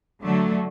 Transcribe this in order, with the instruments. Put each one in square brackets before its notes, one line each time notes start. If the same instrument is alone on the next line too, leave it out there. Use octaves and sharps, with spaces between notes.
[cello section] D3 F#3 A3